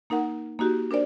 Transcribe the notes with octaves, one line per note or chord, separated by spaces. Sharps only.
A#3 D#4 A#4 F#5
A#3 D#4 F#4 G4
D4 A#4 C5 D5